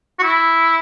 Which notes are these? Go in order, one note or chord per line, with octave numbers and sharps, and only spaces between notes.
F#4
E4